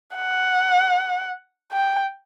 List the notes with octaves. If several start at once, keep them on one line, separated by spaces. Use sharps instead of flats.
F#5
G5